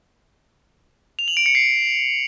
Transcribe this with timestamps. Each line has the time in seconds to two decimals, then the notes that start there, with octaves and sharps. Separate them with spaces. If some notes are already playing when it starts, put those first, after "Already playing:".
1.19 F7
1.28 F#7
1.37 D7
1.46 C#7
1.55 C7